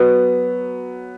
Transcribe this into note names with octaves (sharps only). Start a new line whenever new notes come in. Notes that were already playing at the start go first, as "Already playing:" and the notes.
Already playing: F#3 B3